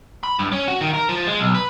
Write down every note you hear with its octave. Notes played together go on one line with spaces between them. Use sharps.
B5
G2
C#4
F#4
D#3
A#4
F3
G#3
B1
B4